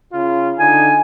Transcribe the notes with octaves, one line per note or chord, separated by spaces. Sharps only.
C#3 F4
D3 D#4 G#5